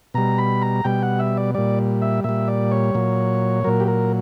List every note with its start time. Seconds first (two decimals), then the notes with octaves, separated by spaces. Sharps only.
0.14 B2 G3 A#5
0.38 B5
0.62 A#5
0.84 B2 G3 G5
1.02 F#5
1.19 E5
1.37 D5
1.54 A#2 G3 D5
2.02 E5
2.24 A#2 G3 E5
2.48 D5
2.71 C#5
2.95 A#2 F#3
3.64 A#2 F#3 A#4
3.80 G4
3.88 A#4